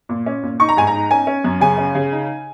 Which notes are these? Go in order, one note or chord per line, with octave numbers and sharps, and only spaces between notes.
A#2
C#4
A#2
D#4 C#6
A#5
G#2 G#5
A#5
D#4
C#4 G#5
C#4
F#2
C#3 G#5
C#4
C#3
D#4